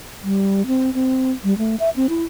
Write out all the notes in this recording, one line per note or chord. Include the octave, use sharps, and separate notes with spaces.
G3
C4
C4
G3
A3
E5
C4
E4